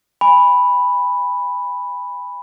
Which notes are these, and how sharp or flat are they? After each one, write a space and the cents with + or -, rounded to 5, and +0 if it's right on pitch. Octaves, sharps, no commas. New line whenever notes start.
G#5 -30 B5 +0